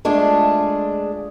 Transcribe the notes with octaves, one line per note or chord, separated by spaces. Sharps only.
G#3 A3 D4 F4 G#4